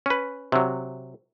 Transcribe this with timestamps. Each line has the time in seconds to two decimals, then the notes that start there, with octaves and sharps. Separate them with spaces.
0.06 C#4 B4
0.52 C3 F#3